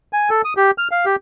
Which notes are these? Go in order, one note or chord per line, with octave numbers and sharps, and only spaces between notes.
G#5
A4
D#6
G4
F6
F5
G4